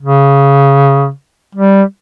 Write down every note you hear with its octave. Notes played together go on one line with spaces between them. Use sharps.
C#3
G3